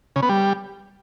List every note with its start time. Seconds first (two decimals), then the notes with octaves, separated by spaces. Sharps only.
0.16 C#3
0.23 B3
0.29 G3